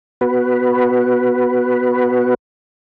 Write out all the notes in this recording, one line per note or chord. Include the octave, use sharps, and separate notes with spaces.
B3 F#4 B4